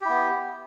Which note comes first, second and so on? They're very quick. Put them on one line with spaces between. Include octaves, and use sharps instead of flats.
G4 E4 B3